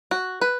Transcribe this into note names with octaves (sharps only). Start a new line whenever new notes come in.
F#4
B4